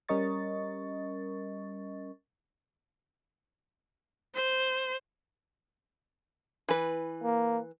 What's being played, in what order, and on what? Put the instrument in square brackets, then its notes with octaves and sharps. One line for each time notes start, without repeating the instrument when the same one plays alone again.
[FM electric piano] G3 C#4 A#4 D#5 C#6 A6
[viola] C5
[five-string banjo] E3 B4
[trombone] A#3